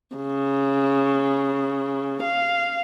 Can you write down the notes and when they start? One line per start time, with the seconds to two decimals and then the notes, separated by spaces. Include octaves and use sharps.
0.16 C#3
2.24 F5